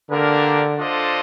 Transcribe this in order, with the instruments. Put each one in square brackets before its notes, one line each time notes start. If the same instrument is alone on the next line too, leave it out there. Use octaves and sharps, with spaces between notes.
[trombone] D3 [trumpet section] A#3 D4 G4 A#4
[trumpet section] D4 F4 A4 C5 D#5